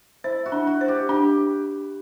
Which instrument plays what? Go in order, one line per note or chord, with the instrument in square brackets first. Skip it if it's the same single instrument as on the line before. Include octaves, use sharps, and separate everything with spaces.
[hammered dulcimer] E4 [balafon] C5
[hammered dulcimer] F#4
[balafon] D4
[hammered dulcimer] F#4
[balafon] C5
[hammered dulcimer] G4
[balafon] D4 [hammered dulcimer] G4